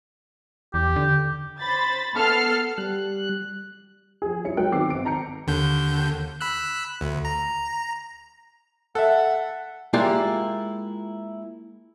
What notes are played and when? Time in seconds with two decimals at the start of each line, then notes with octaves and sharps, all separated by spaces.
0.74 E2 G4
0.96 D3
1.60 C5 B5 A6
2.14 B3 A4 F6 C7
2.78 G3 F#6
4.22 F3 G#4
4.44 G2 E4 C#5 C#7
4.57 F#3 G#3 A#4 G5 F#6 D7
4.72 D#3 B3 C4 D6 E6 C7
4.90 G#1 D7
5.05 A5 A#5 G6 C#7
5.47 D#2 D3 G6
6.41 B5 E6 F#6
7.01 D2
7.25 A#5
8.95 A4 E5 F#5
9.93 G#3 A#3 E4 F4 G4 D5